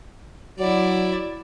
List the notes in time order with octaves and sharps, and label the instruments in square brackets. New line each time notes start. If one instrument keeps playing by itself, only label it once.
[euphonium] F#3 [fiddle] E4 D5